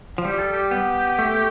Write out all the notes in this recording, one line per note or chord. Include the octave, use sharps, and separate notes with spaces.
F3
G3 G4
A4
G4
B3
A3